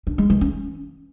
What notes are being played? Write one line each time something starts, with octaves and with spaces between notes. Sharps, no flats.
D4
G#3
E3
C#4